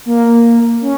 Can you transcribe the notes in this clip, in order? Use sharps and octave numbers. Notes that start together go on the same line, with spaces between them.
A#3
C#4